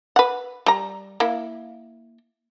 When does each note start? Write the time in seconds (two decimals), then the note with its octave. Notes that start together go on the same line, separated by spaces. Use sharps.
0.16 B4 F#5
0.66 G3 A#5
1.20 A#3 E4